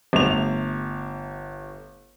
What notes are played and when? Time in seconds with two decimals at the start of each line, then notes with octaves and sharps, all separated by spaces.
0.13 G1 A3 F7